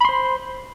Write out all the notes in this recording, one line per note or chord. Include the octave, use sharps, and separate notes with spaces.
C5 B5 C6